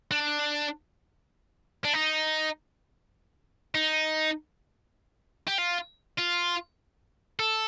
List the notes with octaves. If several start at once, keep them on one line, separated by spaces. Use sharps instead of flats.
D4
D4
D#4
D#4
G4
F4
F4
A4